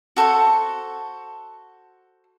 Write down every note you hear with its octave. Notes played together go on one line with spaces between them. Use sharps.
F#4 A4 C5 C#6